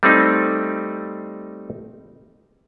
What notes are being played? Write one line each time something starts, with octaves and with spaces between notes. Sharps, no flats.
G3 A3 C4 D#4